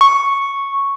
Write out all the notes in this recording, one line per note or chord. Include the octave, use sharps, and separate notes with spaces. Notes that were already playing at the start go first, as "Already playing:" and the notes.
C#6